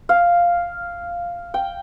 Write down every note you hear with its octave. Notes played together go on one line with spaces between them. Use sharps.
F5
G5